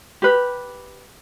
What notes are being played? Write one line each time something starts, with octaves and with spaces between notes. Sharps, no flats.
G4 B4